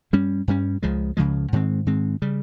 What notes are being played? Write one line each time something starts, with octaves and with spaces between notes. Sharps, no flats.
G2 G3 C#4
G2 G3 C#4
C#2 C#3 F3 G#3
C#2 C#3 F3 G#3
G#2 D#3 G#3 C4
G#2 D#3 G#3 C4
C#3 G3